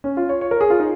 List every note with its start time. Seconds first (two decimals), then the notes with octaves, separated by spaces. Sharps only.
0.04 C#4
0.17 F4
0.29 C#5
0.41 C#5
0.51 A#4
0.61 G#4
0.70 F4
0.80 D#4